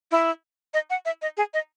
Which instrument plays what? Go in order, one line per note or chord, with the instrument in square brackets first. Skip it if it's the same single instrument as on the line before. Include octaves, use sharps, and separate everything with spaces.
[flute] E4
D#5
F#5
E5
D#5
G#4
D#5